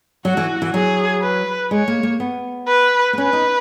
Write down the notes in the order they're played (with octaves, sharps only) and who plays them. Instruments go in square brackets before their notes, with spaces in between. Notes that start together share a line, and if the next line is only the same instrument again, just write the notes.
[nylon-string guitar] F#3 [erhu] F#4
[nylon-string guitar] E3
E3
[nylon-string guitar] F#3 [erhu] G#4
[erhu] B4
[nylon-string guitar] G#3 [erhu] C#5
[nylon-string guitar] A#3
A#3
B3
[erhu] B4
[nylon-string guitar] B3
[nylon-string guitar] C#4 [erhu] B4
[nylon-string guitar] D#4